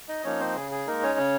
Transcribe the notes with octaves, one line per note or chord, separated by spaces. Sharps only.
D#4 D#5
F3 A#3 C#4 D#4 C#5
C4 C5
C#3 G#4
G#4
G#3 A#3 D#4 A#4
C#4 C#5
C#3